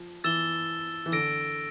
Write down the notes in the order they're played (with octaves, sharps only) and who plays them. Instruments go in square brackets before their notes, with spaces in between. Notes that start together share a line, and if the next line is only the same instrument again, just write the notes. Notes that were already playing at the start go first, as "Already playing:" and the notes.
Already playing: [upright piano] F3
[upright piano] E3 [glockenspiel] E6 A6 E7 G7
[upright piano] E3
[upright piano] D3 [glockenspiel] E6 A#6 D7